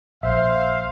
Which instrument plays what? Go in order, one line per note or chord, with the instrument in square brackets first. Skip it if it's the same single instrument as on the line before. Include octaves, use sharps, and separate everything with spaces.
[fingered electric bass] A#1 [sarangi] C5 [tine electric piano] E5 [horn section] F5